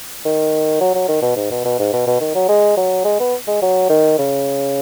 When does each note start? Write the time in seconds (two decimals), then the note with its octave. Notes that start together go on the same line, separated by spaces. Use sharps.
0.24 D#3
0.81 F#3
0.95 F#3
1.08 D#3
1.22 B2
1.36 G#2
1.51 B2
1.65 B2
1.79 G#2
1.93 B2
2.07 B2
2.21 D#3
2.35 F#3
2.49 G#3
2.77 F#3
3.05 G#3
3.20 B3
3.48 G#3
3.62 F#3
3.89 D#3
4.18 C#3